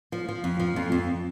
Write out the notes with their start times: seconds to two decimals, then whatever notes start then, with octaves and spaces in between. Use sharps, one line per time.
0.12 F3
0.29 F3
0.44 F2
0.60 F3
0.76 F2
0.92 F2